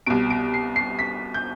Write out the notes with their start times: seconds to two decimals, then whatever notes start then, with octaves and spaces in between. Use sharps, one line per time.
0.06 C2 B2 D7
0.30 D7
0.54 C7
0.76 C7
0.99 B6
1.34 G6